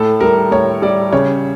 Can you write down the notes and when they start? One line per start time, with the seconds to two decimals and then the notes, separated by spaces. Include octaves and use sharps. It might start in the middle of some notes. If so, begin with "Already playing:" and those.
Already playing: A2 A4
0.20 G3 A#4
0.51 A2 C#5
0.82 G3 D5
1.13 C#3 C#5